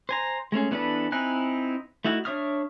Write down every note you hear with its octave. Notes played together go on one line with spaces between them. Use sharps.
C5 G#5 A#5
G#3 A3 C#4 G#4
E3 B3 D4 A4 B4
C4 D#4 E4 G#5 F#6
A3 D#4 E4 F#4
D4 C#5 E5 D#6 F6